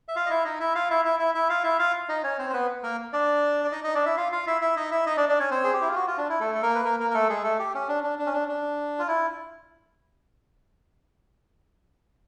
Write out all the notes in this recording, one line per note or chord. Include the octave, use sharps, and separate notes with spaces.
E5
F4 F5
D#5
E4 E5
D#4 D#5
E4 E5
F4 F5
E4 E5
E4 E5
E4 E5
E4 E5
F4 F5
E4 E5
F4 F5
D#4 D#5
C#4 C#5
C4 C5
C5
B3 B4
A#3 A#4
D4 D5
D5
D#4 D#5
D#4 D#5
D4 D5
E4 E5
F4 F5
F4 F5
E4 E5
E4 E5
D#4 D#5
E4 E5
D#4 D#5
D4 D5
D4 D5
C#4 C#5
C4 C5
G#4
G4
E4
F4
F#4
F4
D4
E4
A3 A4
A4
A#3 A#4
B4
A#3 A#4
A#3 A#4
A#4
A3 A4
G#3 G#4
A3 A4
G4
C#4
D4
D4
D4
C#4
D4
D4
F4
E4